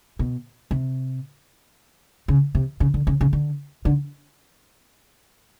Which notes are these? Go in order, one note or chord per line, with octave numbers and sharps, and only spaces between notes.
B2
C3
C#3
C3
C#3
D3
C#3
C#3
D3
D3